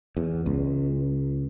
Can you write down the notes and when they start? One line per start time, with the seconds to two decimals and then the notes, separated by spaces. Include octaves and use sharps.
0.17 E2
0.46 C#2